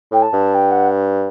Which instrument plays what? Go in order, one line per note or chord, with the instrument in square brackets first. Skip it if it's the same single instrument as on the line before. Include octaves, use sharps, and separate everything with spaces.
[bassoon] A2 [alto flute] G5
[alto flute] A5
[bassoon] G2
[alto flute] G5
F#5